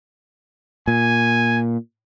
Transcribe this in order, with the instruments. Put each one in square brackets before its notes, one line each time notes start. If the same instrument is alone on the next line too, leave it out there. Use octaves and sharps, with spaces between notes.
[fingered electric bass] A#2 [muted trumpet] G#5